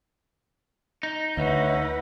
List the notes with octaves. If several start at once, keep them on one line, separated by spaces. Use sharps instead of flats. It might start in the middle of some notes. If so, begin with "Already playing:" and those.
D#4
D2 B4 C#5 E5 F#5